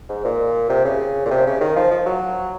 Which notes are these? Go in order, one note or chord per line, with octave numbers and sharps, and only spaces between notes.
G#2
A#2
C3
C#3
A#2
C3
C#3
D#3
F3
F3
F#3